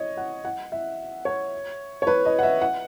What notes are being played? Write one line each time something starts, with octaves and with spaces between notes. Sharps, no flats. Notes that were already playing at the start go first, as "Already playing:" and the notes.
Already playing: C#5 D#5
F#5
F#5
E5
C#5
C#5
B4
D#5
F#5
E5
F#5